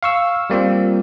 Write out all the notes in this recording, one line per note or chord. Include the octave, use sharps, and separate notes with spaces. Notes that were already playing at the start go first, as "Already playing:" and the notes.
F5 C#6 E6
G3 A#3 C4 F4